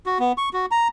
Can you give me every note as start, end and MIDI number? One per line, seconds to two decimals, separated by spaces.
0.06 0.18 66
0.19 0.32 59
0.38 0.49 85
0.53 0.66 66
0.71 0.88 82